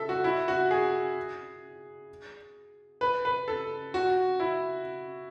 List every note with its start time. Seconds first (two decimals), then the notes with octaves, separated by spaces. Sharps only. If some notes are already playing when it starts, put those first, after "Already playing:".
Already playing: A4 E5
0.09 F#4
0.24 E4
0.48 F#4
0.71 G#4
3.01 B4
3.25 B4
3.48 A4
3.94 F#4
4.40 E4